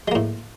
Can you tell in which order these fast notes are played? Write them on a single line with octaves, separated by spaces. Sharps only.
G#3 A#3 A2